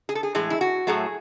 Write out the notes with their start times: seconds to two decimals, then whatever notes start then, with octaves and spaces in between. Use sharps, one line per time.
0.09 G#4
0.15 A4
0.23 G#4
0.35 A2 E3 G#3 G#4
0.50 E4
0.61 F#4
0.87 A2 F#3 A3 G#4